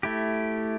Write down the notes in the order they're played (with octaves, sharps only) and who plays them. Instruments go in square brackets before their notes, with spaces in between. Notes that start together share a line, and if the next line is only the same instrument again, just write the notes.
[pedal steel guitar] A3 E4 G4